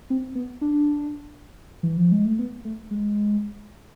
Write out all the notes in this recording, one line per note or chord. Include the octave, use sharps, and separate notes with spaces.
C4
B3
D4
E3
F3
G#3
A3
B3
A3
G#3